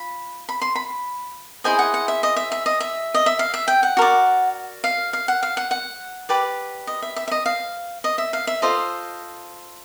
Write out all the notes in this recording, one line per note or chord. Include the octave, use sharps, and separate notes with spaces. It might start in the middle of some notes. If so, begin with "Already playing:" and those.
Already playing: F4 B5
B5
C6
B5
E4 G#4 C5 D#5 G#5
F#5
F#5
E5
D#5
E5
E5
D#5
E5
D#5
E5
F5
E5
G5
F#5
F#4 A#4 D5
F5
F5
F#5
F5
F#5
F#5
G4 B4 D5
D#5
E5
E5
E5
D#5
F5
D#5
E5
F5
E5
F4 A4 C5 D#5